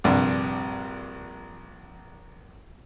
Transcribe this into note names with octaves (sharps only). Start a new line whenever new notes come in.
A#1 G2 C3